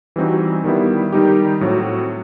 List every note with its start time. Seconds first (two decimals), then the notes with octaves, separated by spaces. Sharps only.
0.16 E3 G3 C4 D#4 F#4
0.64 D#3 G3 B3 E4
1.12 D#3 G3 D#4 G4
1.61 A2 F#3 C4